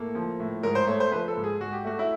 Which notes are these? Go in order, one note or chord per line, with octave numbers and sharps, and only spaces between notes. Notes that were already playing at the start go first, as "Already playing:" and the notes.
Already playing: A2 A#3 A4
F3
A2
G#2 A#4
C5
A3 C#5
C5
F3 B4
A4
G#2
G#4
G#2 F#4
G4
A3 F#4
E4